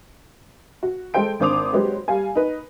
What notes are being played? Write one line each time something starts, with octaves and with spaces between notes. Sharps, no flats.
F#4
G#3 A4 C5 G5 D7
G#1 D4 C5 D6 D#6 F7
F#3 G#3 G4 B4 C5
G3 F5 G#5
D#4 B4